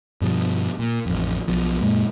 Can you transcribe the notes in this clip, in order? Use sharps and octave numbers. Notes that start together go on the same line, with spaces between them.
G2 B2 F3
A#2
A1 F2
B1 B2 F3
F#2 A#2 G#3 A#3